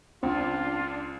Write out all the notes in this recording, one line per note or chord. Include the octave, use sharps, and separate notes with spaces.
C#2 C4 D4 F4